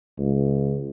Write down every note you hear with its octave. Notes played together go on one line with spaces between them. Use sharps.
C#2